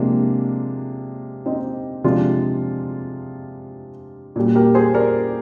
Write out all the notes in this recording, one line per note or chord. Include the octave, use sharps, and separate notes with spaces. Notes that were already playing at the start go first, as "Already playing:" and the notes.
Already playing: C3 F3 G#3 A#3 D4
C4 D#4
C3 F3 G#3 D4 F4
A#2 G3
G4 A#4
G#4 C5
A#4 D5